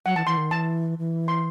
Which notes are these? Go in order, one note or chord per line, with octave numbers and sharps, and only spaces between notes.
F#3 F#5
E3 A5
E3 C6
D#3
E3 A5
E3
C6